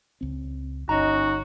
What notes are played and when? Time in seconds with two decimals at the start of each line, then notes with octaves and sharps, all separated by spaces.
0.21 C#2 C4
0.89 G1 C#4 D#4 F#4 A#5